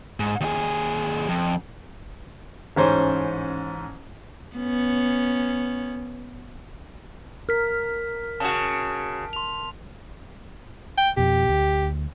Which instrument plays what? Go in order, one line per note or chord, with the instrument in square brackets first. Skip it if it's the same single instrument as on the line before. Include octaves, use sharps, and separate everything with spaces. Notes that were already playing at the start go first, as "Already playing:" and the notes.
[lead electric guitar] G#2
D#2 G#4
F2
[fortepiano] A1 G#2 C#4 C5
[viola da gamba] B3 C#4
[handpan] A#4 [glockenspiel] F6 B6
[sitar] C#3 F#4 [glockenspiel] A5
[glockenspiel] C6 F7
[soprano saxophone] G5
[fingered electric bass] F2 B2 [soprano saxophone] G4
[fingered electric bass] D2